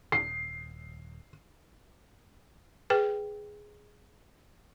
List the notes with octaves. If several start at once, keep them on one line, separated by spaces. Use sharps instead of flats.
D#1 C7
G#4 B4 G5